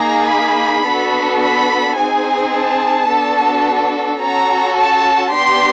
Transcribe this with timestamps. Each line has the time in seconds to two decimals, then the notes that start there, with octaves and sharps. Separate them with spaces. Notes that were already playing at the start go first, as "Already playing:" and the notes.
Already playing: A#3 D#4 G#4 A#5
0.31 B5
0.86 B3 D4 F#4 A4
1.43 B5
1.98 C4 D#4 G#4 G#5
2.54 A5
3.10 B3 D4 F#4 A4
4.21 C#4 F#4 A4 A#5
4.77 A5
5.32 B3 D4 G4 C6